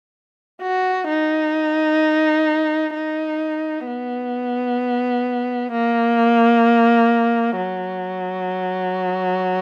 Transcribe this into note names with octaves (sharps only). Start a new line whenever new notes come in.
F#4
D#4
D#4
B3
A#3
F#3